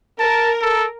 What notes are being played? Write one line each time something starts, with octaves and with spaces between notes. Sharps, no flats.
A#4 A5
A4